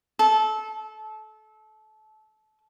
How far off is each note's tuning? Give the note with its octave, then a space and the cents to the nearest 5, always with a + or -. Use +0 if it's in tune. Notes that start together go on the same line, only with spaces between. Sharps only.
A4 -25